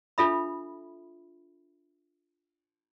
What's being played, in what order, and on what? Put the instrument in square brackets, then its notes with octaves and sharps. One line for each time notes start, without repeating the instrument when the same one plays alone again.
[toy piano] D4 F4 A4 E5 B5